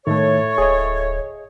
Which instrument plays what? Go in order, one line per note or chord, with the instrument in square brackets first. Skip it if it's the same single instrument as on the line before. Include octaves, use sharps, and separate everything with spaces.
[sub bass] A2 [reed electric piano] D#3 A3 [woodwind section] E4 A4 C#5
[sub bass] D1 [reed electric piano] G#4 D#5